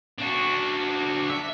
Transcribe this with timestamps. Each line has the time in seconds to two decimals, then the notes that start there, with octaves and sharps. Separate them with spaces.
0.18 D4 F#4
1.30 E5